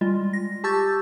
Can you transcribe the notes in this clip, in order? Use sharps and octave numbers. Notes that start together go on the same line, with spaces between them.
G3 G#3 F4
A#6
G4 A5 C#6 E6 G6 A6